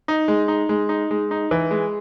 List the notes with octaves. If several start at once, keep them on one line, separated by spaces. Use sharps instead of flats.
D#4
G#3
D#4
G#3
D#4
G#3
D#4
E3
G#3